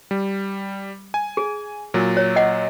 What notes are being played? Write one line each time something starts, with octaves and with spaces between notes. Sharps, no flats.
G3
G#5
G#4
A#2 F#3
C#5
D#5 F#5